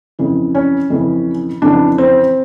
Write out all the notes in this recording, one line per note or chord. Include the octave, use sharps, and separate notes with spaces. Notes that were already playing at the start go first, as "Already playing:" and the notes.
F2 C#3 E3
C#4
F2 C#3 E3
F2 C#3 E3 D4
C4